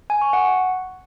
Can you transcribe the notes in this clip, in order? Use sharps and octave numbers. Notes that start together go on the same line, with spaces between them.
G#5
C#6
F#5